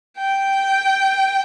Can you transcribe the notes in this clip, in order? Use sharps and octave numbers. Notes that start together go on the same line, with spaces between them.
G5